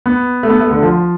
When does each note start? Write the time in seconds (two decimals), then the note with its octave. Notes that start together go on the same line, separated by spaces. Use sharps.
0.06 B3
0.43 A3
0.49 B3
0.60 A3
0.71 D3
0.82 F3